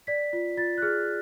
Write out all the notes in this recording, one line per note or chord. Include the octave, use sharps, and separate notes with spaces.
D5 B6
F4
F4 A6
F#6
G#4 F6